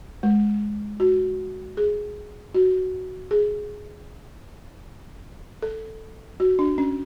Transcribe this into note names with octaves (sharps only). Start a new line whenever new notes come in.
G#3
F#4
G#4
F#4
G#4
A4
F#4
D4
C#4